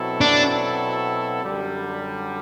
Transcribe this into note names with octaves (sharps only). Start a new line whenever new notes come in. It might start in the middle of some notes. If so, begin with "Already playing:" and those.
Already playing: B2 F#3 C4 E4 A4
D4
F#2 D3 G3